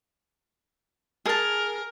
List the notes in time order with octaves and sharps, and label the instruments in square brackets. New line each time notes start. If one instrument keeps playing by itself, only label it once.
[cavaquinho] G#4 A5 [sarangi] A#4